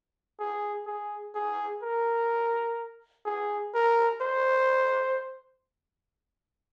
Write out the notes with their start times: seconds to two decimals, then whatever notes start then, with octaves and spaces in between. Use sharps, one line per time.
0.40 G#4
0.87 G#4
1.35 G#4
1.83 A#4
3.26 G#4
3.74 A#4
4.22 C5